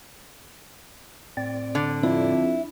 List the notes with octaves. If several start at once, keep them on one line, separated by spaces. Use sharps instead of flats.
A2 C4 D5
D3
F2 E4